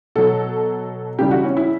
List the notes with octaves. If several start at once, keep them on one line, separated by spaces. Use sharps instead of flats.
B2 F#3 A4
C#3 E3 G3 G4
F#4
C#4
E4